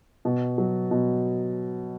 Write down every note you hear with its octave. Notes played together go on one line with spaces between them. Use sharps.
B2
F#3
B2